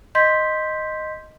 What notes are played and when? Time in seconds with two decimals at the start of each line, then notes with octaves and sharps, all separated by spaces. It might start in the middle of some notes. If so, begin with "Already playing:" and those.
0.15 D#5 C6 G6 B6